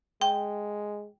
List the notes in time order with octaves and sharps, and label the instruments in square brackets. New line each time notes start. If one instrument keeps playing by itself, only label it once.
[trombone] G#3 [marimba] G5